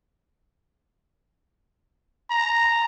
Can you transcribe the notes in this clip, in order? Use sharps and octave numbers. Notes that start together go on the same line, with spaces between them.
A#5